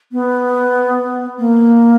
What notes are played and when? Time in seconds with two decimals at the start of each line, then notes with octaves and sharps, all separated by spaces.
0.12 B3
1.38 A#3